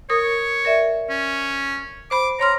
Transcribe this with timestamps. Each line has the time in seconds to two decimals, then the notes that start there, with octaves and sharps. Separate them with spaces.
0.10 A#4 C#5 D#6
0.65 A#4 D5 E5
1.10 C#4
2.11 C5 B5 D6
2.40 C#5 A#5 C6 F6